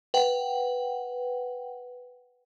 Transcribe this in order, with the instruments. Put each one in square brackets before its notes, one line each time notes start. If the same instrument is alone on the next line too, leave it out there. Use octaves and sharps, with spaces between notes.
[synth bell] B4 F#5 G5